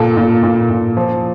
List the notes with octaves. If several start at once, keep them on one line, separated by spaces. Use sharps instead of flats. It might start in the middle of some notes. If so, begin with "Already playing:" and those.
Already playing: A#2 A4
A#2
A#2
A#2
F3